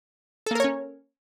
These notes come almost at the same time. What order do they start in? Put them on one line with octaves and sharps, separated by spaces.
A4 A#3 A#4 C#5 C#4